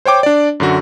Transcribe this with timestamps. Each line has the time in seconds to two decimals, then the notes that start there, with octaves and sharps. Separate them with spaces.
0.05 C5 C#5 G5 D6
0.23 D4 D5
0.60 F#2 D3 F#4